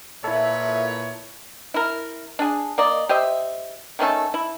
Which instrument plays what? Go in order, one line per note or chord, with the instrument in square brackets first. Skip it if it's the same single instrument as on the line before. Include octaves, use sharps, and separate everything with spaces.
[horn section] A#2 B4 C#5 [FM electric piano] E4 A4 [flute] E5
[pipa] E4 A#4
D4 G#4
A#3 D5 D#5
G4 C5 D#5 E5
D#3 A3 C#4 A4
E4